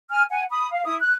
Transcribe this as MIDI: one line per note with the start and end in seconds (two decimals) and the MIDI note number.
0.11 0.23 80
0.11 0.23 89
0.30 0.43 78
0.30 0.43 80
0.50 0.67 83
0.50 0.67 87
0.71 0.84 77
0.85 0.95 64
0.85 0.95 87
1.00 1.13 90